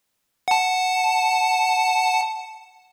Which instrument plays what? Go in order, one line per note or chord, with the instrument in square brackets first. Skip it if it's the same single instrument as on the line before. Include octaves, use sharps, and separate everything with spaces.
[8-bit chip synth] F#5 A5